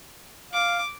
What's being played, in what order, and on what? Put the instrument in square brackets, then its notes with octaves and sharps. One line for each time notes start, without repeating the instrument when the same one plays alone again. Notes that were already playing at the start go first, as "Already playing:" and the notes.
[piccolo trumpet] F5 [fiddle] D6